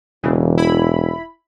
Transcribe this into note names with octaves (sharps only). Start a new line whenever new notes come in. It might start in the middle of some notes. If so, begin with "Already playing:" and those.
E1 C#3 E3
E4 B5